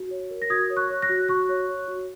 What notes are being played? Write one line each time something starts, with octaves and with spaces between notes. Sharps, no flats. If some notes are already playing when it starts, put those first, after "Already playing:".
Already playing: F#4
C#5
A#4
A#6
F#4 D#6 G#6
C#5
C#6 F#6
C#5
F#6 A#6
F#4
F#4 C#6 F#6
C#5
C#5
F#4